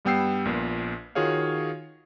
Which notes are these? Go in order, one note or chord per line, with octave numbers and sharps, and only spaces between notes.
G2 G3 B3 G5 E6 C7
A#1 A#2 B3
D#3 F4 F#4 G#4 C#5 F5